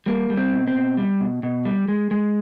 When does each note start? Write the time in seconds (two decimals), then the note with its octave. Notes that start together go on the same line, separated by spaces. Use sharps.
0.06 G3 A#3
0.30 G3
0.37 C4
0.52 B2
0.68 C4
0.75 B2
0.97 G3
1.20 B2
1.43 B2
1.65 G3
1.88 G#3
2.11 G#3